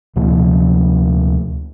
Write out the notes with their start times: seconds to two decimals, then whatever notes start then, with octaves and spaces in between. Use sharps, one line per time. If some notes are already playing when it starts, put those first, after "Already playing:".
0.16 D2 C3 F3